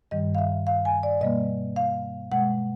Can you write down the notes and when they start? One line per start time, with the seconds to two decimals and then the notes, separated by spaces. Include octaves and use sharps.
0.11 G2 D#3 G3 D#5
0.35 F5
0.38 E5
0.67 F5
0.85 G#5
1.03 D5
1.21 B2 G3 A#3 D#5
1.76 F5
2.31 B2 G#3 F#5